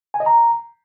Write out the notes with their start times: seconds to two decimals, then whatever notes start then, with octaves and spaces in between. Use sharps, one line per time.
0.14 G#5
0.20 D#5
0.26 A#5